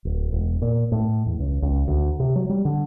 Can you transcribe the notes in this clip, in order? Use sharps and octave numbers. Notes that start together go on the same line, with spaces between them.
D1
E1
A#2
A2
E2
C#2
C#2
D2
C3
F#3
G3
D3